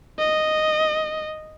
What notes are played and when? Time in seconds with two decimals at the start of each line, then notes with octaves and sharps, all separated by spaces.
0.19 D#5